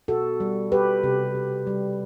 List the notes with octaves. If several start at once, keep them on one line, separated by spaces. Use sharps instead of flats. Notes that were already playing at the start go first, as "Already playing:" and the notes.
B2 F#4 A4
G3
G3 G4 B4
C3
C3
G3